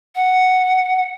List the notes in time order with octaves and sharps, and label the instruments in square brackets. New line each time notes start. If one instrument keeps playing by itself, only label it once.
[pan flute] F#5